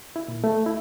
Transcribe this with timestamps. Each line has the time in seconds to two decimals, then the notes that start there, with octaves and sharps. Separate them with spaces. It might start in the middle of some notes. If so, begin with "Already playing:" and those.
0.16 E4
0.28 A#2
0.44 A3
0.66 E4